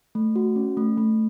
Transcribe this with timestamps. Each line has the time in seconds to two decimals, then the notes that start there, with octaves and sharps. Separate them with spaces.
0.15 A3
0.36 F#4
0.56 C#4
0.77 A3
0.98 A3